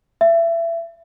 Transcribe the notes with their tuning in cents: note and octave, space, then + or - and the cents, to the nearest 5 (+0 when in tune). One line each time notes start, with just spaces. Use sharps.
E5 +25